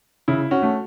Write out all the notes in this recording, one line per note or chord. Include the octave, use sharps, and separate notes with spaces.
C#3 E4
C#4 F#4
A3